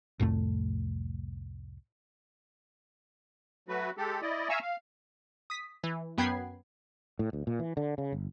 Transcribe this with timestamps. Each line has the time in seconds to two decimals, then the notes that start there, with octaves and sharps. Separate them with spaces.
0.20 C2 F2 A2 A3
3.68 F#3 A3 F#4 B4
3.97 G#3 G4 A4
4.22 E4 D5 D#5
4.49 E5 F5 G#5 A#5 C#6 E6
4.62 F5
5.50 D#6 B6
5.84 E3
6.18 F#2 B3 G5 B5 G#6 C7
7.19 A2
7.33 D2
7.47 A#2
7.59 E3
7.77 D3
7.98 C#3
8.12 G1